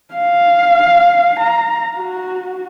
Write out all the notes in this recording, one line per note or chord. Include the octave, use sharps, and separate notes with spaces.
F5
A#5
F#4